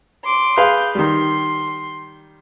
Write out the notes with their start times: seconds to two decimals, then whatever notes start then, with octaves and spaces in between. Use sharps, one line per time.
0.24 C6 D6
0.58 G#4 B4 F5 G6
0.95 D#3 G3 C6